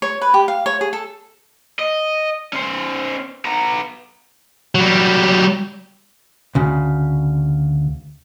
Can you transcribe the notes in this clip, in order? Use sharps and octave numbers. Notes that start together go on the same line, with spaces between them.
C#5
B4
G4
F5
C#5
G#4
A4
D#5
C#4 C5
B3 A#5
F#3 G3
D2 C#3